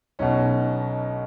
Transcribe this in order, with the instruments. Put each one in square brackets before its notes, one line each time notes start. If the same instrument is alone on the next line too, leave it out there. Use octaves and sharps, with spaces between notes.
[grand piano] B1 B2 C#4